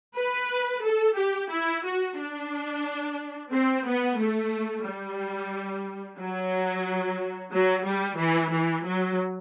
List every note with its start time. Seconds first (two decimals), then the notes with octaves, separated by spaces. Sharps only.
0.17 B4
0.84 A4
1.17 G4
1.51 E4
1.85 F#4
2.18 D4
3.51 C4
3.85 B3
4.18 A3
4.85 G3
6.18 F#3
7.52 F#3
7.85 G3
8.18 E3
8.51 E3
8.84 F#3